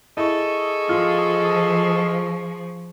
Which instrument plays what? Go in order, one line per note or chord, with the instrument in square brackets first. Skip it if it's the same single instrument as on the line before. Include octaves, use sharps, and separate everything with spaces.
[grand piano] E4 [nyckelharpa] G#4 C#6 [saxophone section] A4 D#5
[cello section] F3 [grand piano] F4